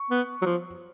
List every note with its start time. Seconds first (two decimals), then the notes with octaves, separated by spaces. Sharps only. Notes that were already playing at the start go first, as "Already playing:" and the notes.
Already playing: C#6
0.10 B3
0.42 F#3
0.46 F3